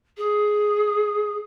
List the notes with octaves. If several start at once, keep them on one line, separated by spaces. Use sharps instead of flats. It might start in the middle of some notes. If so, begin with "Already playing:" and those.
G#4